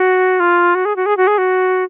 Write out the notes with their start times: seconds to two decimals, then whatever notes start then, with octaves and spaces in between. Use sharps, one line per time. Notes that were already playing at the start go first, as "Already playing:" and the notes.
Already playing: F#4
0.40 F4
0.75 F#4
0.85 G#4
0.96 F#4
1.06 G#4
1.17 F#4
1.27 G#4
1.38 F#4